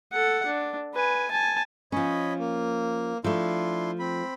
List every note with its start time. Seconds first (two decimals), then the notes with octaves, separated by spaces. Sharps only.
0.13 A4 F#5
0.46 D4
0.95 B4 G#5
1.31 G#5 A5
1.92 F3 C#4 C#5 D#5 B5
2.39 A#3
3.24 F3 A3 D4 E4 C6
3.99 C4 B5